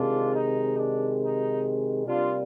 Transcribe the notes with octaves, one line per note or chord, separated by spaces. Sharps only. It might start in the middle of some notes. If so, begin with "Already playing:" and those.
Already playing: C3 D#3 G#3 D4 F4
D#4
D4
D#4
C3 G3 A#3 D4 F4